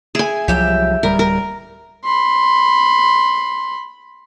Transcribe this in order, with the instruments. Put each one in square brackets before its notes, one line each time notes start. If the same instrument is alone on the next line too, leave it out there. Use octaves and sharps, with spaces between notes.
[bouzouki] E4 [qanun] G#4 G#5
[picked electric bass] C2 F3 F#3 [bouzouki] G4 E5 G5
[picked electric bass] D1 G3 [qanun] A#4
[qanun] A#4
[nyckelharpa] B5 C6